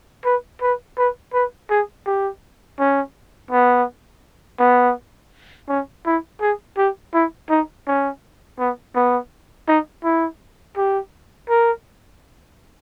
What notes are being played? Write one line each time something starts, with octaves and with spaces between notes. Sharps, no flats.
B4
B4
B4
B4
G#4
G4
C#4
B3
B3
C#4
E4
G#4
G4
E4
D#4
C#4
B3
B3
D#4
E4
G4
A#4